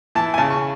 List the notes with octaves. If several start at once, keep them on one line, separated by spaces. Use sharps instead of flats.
E3 A5
G#5
C#3 A5
C#6